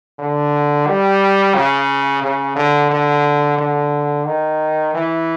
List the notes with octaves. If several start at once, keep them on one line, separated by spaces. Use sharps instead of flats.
D3
G3
C#3
C#3
D3
D3
D3
D#3
E3